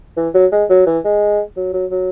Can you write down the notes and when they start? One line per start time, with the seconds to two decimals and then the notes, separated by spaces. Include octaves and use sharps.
0.17 E3
0.34 F#3
0.52 G#3
0.69 F#3
0.86 E3
1.04 G#3
1.57 F#3
1.73 F#3
1.91 F#3